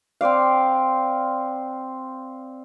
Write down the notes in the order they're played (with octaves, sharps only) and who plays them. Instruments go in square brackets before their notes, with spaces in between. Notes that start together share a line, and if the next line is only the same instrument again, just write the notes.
[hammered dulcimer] C4 C5 D5 F5